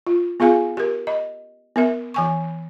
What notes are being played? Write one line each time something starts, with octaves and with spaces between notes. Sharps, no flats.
F4
B3 F4 G#4 F5 G#5
G4 A#4
D#5
B3 A#4 E5
E3 G#5 C#6